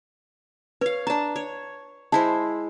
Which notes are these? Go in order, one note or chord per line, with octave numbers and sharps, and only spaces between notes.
B4 C#5 F5
D4 A5 A#5
C#5
G#3 E4 C5 A5